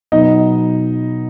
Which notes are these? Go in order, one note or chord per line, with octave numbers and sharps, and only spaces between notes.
B2 F#3 B3 D#4 D#5